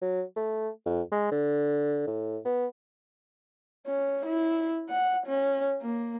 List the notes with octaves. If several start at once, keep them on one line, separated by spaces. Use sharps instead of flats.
F#3
A3
F2
G#3
D3
A2
B3
C#4
E4
F#5
C#4
A#3